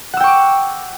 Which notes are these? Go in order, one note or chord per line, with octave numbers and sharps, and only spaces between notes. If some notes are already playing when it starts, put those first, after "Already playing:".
F#5 G5 C#6 D6 E6